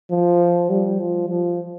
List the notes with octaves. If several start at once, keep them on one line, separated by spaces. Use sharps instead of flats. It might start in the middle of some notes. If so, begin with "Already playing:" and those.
F3
G3
F3
F3